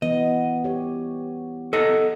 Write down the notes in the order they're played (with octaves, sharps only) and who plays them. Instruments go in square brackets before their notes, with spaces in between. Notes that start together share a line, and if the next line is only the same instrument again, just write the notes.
[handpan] E3 B3 [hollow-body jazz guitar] D#5
[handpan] G4 C#5
[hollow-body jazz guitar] A4 D#5 F#5